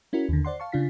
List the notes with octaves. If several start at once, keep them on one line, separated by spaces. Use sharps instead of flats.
C#4 E4 F#4 A#4
D#2 D3
C5 D5 F#5 C6
F5 A5 C#6
C#3 D4 F4 F5 B6